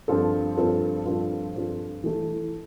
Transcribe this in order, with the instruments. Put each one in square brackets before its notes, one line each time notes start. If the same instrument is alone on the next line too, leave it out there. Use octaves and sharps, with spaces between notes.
[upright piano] G2 F3 C4 F4 A4
G2 F3 C4 F4 A4
G2 F3 C4 F4 A4
G2 F3 C4 F4 A4
E3 A3 E4